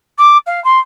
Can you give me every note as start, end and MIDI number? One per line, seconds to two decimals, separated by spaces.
0.18 0.37 86
0.46 0.62 77
0.64 0.79 84